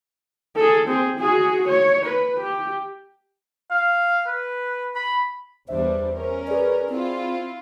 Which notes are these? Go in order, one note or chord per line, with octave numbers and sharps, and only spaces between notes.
G#4 A4
C4 G#4
F#4 G#4
C#5
B4
G4
F5
B4
B5
E2 G3 D4 C5 E5
C#4 A#4
G#4 B4 D5
C4 E4 F4